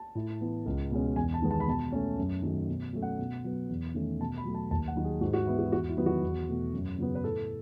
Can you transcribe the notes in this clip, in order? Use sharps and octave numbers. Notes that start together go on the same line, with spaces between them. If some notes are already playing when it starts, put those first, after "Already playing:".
Already playing: A5
A2
E3 B3
C#2
B2 G#3 C#4
E2 G#5
A5
D#3 G#3 B3
A5
B5
B2 A5
A3 C#4
F#2
D#3 F#3 A3
B2
F#3 A3 C#4
F#5
B2
F#3 B3
E2
D#3 A3 C#4
B2 A5
B5
F#3 A3
A5
D#2 A5
F#5
D#3 F#3
G#4
G#2 F#4
F#4
E3 B3 E4
F#4
E2 F#4
E4
D#3 F#3 B3
F#4
E2
B2 A3
F#2
C#3 F#3 B3
B4
A2 A4